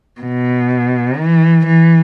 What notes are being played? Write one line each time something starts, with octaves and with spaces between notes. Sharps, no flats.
B2
E3
E3